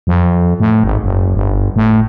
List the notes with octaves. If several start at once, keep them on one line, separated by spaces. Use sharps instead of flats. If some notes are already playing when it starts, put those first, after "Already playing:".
F2
A2
G#1
F#1
G1
A2